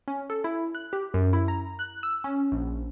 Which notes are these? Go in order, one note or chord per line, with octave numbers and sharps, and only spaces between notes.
C#4
A4
E4
F#6
G4
F#2
E4
A#5
F#6
E6
C#4
A#1